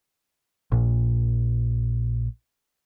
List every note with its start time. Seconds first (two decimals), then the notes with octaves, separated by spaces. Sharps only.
0.72 A#1 A#2